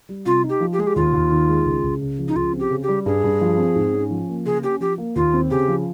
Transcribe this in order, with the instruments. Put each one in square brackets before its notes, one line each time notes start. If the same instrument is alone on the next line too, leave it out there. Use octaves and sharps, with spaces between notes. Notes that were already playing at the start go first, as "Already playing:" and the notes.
[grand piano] G3
[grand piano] C3 [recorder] F4
[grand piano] D#4
[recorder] G4
[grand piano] F3
[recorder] G4
[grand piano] G#3 [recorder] G#4
[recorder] G4
[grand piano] D#2 [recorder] F4
[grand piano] D#2
D#3
G#3
C#2
C#2
C#3
F3
[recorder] D#4
[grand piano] C#2 [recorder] F4
[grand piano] C4
[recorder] G4
[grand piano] C#3
[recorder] G4
[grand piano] G3
[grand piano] G2 [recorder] G#4
[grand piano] G2
F3
C4
G#2
C#4
F3
A#3
[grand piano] C#3 [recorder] G#4
[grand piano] C#4 [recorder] G4
[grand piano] F3 [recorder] G4
[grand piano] A#3
[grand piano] D#2 [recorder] F4
[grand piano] C4
[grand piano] C#3 [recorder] G4
[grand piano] F3